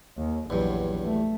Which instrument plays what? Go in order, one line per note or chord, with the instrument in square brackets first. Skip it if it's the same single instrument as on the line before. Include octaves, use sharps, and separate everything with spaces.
[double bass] D#2
[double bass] A#1 F#3 [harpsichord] E2 G2
[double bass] A3